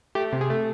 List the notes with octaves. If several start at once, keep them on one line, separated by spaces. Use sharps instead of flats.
A3 G4
C3
G#4
A3